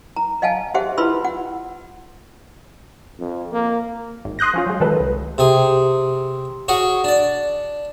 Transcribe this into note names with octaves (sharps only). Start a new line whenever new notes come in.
A#5
D#5 F5 F#5 G#5 A5
G4 G#4 C5 E5 F#5
E4 F4 B4 B5 C6 E6
F#5
F2
A#3
G#1
C6 D#6 F#6 G6 A#6
F3 C#4 F4
F#3 G#3
D#3 F#3 G#3 A4 B4
C2
C3 G#4
C#4 F#4 G#4
D4 D5